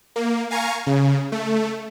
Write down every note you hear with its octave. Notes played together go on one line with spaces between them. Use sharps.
A#3
F5 G#5 A#5 C#6
C#3
A3